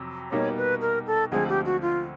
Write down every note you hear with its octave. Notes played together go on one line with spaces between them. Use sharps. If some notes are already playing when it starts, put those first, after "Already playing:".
Already playing: F2 C3 F#3
B2 G3 A#3 D#4 C#5
B4
A#4
A4
D2 D3 F3 G#3 C4 G#4
G4
F#4
F4